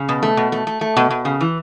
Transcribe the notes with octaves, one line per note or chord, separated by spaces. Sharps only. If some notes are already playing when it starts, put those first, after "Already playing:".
Already playing: C#3
B2
A3
B2
A3
A3
A3
B2
B2
C#3
E3